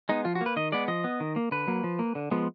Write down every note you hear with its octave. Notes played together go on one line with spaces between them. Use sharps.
G#3 B3 D#4
F3 F4
F#4
A#3
B4
D#3 D#5
G#3 B3 D5
F3 D#5
B3
D#3
A#3
D3 B4
F#3 A#3
F3
A#3
D3
F3 G#3 B3